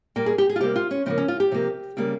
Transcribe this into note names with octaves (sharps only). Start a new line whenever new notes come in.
A#2 G3 A#3 G5
G#4
G4
G#4
F4
C3 G3 A#3 G4
F4
C#4
C#3 F3 A#3 C4
C#4
F4
G4
C3 F3 A#3
C#3 G3 A#3